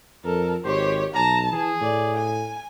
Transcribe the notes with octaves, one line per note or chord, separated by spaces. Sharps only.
F2 A4 A#4
G#1 G4 C5 C#5
B1 A5 A#5
E3 G#4
A2 D5
G#5